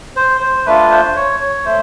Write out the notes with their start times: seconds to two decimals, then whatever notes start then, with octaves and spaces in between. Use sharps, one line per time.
0.16 C5
0.41 C5
0.66 A3 D4 F4 B4
0.90 C5
1.16 C#5
1.40 C#5
1.65 A3 C5